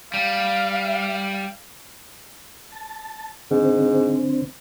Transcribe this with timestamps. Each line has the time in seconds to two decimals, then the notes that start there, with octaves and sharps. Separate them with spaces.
0.14 G3 F5
2.72 A5
3.51 G#2 D3 C4